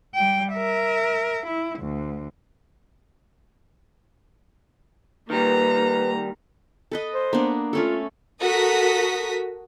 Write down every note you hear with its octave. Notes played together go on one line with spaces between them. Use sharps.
G3 G5
A#4 E5
E4
D2
D#3 G3 A#3 B4 A#5
A4 B4 D#5
C5
A#3 B3 D4
A3 C#4 F4 A4
F#4 A4 A#4 D#6 B6